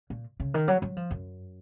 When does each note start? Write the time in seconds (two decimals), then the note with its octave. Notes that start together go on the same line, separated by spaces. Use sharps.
0.10 A#2
0.40 C#3
0.54 D#3
0.68 F#3
0.82 F#3
0.97 F3
1.11 F#2